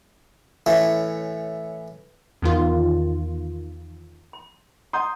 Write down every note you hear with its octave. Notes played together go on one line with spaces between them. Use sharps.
A2 E3 A3 C#4
E2 D#3 F4
C6
D#5 F#5 A#5 C6 D#6 G6